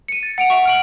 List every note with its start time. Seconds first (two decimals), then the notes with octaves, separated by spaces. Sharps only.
0.08 C#7 D#7
0.23 A6
0.38 F#5 D7 F7
0.50 E5 F#5 C#6
0.65 F6 D7 F#7